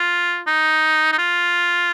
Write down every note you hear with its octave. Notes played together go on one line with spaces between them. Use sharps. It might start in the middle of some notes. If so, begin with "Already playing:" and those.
Already playing: F4
D#4
D#4
F4